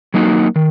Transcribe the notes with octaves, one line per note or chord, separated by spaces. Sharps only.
F#3 A#3 D#4 F#4
D#3